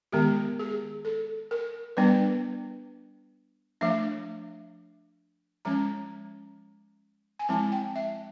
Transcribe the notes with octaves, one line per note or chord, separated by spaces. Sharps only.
D#3 G#3 B3 G4
G#4
A4
A#4
G3 B3 D4 B4
F3 A3 D4 E5
F3 G#3 C#4 A#5
G#5
F3 G#3 C4 E4 A5
G5
E5